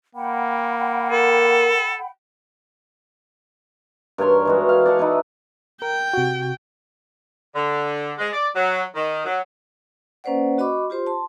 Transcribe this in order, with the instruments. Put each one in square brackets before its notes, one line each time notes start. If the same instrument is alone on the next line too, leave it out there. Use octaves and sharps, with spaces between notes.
[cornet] A#3 [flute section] F#5 G5 B5
[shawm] A4 [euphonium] A#4
[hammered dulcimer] G2 A#4 C#5 C6
E3 G#3 F#4
F5
D5 F#5 A5 C#6
D#4 E4 B4
[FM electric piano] A#4 [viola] G5
[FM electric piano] C3 F#4
[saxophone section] D3
G#3
D5
F#3
D#3
F#3
[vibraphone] A#3 C#4 B4 C5 D5 F#5
F#4 D#5 B5 C#6 D6
F4 G4 C5 C6
A5 C6